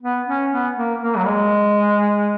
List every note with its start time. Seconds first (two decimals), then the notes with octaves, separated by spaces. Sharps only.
0.02 B3
0.27 C#4
0.52 B3
0.76 A#3
1.01 A#3
1.17 F#3
1.26 G#3